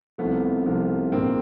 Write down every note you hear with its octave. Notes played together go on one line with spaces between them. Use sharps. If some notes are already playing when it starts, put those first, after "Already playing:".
C2 C3 F3 A3 B3
C2 C3 F3
A#1 G#2 D#3 A#3 C4